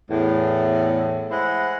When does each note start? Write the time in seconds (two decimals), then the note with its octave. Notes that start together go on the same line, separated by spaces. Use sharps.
0.10 E2 A2
1.31 G#3 E4 C5 F#5